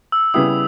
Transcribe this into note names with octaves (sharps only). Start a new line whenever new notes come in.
E6
C#3 G3 B3 E4 G4 D#6